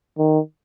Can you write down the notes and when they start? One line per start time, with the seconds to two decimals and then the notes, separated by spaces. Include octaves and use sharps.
0.18 D#3